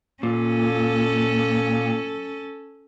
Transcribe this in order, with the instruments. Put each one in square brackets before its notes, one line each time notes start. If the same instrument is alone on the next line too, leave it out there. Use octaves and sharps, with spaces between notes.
[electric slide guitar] A#2 [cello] C#4 A4